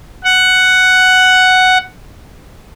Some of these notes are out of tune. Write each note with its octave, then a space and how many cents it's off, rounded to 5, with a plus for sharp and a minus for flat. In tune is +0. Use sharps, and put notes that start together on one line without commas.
F#5 +5